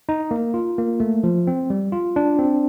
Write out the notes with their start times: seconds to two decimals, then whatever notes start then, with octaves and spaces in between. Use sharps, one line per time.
0.09 D#4
0.31 A#3
0.54 F4
0.78 A#3
1.00 A3
1.24 F3
1.47 C4
1.70 G3
1.92 F4
2.16 D4
2.39 C4